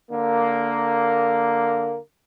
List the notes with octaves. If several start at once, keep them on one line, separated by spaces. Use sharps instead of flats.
D3 A#3